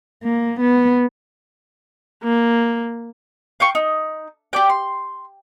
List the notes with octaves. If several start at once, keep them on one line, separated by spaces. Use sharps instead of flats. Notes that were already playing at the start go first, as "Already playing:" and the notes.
A#3
B3
A#3
F5 G5 C#6
D#4
G4 D5 G5
C6